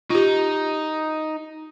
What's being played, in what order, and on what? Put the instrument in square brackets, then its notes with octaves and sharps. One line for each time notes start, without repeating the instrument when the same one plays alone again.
[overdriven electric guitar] D#4 [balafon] F4 G4